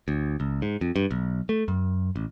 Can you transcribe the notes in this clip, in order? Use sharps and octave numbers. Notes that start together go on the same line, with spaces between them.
D2
C#2
G#2
F2
G2
B1
A3
F#2
A1